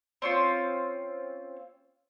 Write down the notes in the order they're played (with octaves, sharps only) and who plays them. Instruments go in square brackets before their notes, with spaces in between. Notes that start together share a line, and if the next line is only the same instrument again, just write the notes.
[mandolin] C4 C#4 F4